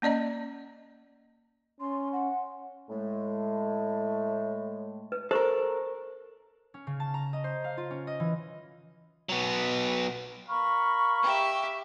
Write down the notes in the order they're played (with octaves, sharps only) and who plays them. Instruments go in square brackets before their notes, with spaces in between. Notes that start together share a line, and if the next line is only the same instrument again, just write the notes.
[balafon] A#3 C#4 D5 D#5 A#5
[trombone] C#4 [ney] C6
[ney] F#5
[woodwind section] A2 G#3 A3
[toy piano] B4
[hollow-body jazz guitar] A4 A#4 [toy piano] C5 C#6
[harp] C#4
C#3
A5
A#5
D#5
C5
F5
F4
C#4
D#5
E3
[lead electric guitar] F#3 B3
[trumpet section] A#4 F5 B5 [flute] C#6
[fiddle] G4 E5